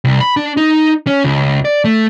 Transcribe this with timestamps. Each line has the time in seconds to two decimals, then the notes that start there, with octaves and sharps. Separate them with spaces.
0.05 C2
0.21 B5
0.37 D4
0.57 D#4
1.07 C#4
1.24 C#2
1.65 D5
1.85 A3